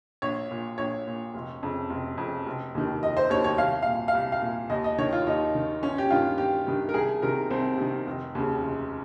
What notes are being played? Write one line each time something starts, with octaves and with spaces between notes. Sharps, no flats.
A#1 C#5
A#2
A#1 C#5
A#2
F1
F2 C#3
F1
F2 C#3
F1
D#2 D#3
F1 D#5
C5
D#2 D#3 C#5
C#5
C2 F5
A#2 F5
F5
C2
F5
A#2
D#2 D#5
D#5
D#3 C#5
F4
D#2 D#4
D#3
G1 C#4
G4
G2 D#3 F4
G1 G4
G2 D#3
A#4
C2 G#4
C3 D#3 A#4
C2 C4
C3 D#3
F1
D#2 C#3
F1